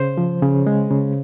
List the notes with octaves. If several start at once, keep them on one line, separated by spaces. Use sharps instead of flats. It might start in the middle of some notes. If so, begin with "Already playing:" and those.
Already playing: C#3 C5
F3
C#3
G#3
C#3